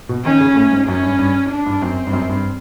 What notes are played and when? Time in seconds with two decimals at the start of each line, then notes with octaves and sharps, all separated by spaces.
0.09 B2
0.25 D#3 C#4
0.40 C#3
0.56 A2
0.72 G#2
0.87 F#2 C#4
1.03 G2
1.19 G2
1.50 D4
1.66 G2
1.81 F#2 C4
2.07 G2
2.13 F#2
2.29 G2